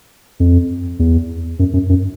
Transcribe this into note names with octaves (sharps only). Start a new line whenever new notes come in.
F2
E2
F#2
F#2
F#2